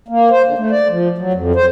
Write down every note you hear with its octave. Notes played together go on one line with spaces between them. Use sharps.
A#3
C5
D3
A3
D5
F3
F#3
F2
C5